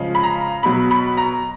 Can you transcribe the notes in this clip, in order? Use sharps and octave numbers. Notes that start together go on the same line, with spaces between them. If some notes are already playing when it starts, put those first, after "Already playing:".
Already playing: C#3 F3 G#3
B5
A#5
B2 F#3 B5
B5
A#5